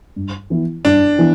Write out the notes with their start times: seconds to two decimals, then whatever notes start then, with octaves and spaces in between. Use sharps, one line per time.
0.16 G2
0.50 E3 B3 E4
0.85 G2 D4
1.18 E3 B3 E4